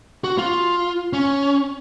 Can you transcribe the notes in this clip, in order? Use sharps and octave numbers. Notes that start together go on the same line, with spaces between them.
F#4
F4
C#4